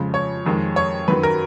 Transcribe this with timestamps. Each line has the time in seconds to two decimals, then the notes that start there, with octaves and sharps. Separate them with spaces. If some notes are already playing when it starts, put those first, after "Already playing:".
Already playing: F2 C#3 F3 G#3
0.14 C#5
0.46 F2 D#3 G#3
0.76 C#5
1.08 F#2 D#3 F#3 B4
1.23 A#4